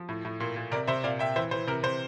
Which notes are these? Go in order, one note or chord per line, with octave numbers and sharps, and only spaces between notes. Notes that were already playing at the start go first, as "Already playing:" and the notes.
Already playing: F3
A2
A2
A#2
A#2
C3 A#4 D5
C3 C5 E5
A#2 D5 F5
A#2 E5 G5
E3 C5 E5
E3 C5
C3 A#4
C3 C5